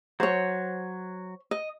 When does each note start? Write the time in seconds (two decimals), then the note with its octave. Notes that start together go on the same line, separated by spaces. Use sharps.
0.20 F#3 C5 C#5
1.51 D#5